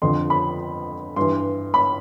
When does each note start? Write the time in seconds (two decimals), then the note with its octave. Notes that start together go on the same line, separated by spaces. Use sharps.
0.02 F2 D3 F3 C6
0.30 B5
1.16 G2 E3 C6
1.74 B5